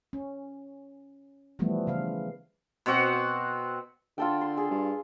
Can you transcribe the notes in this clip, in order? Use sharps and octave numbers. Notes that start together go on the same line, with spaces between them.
C#4
E3 F3 G3 A3 B3
C#3 E3 F5
B2 C4 F#4 F#5
D3 F4 A4 G5
C6
G#4
G2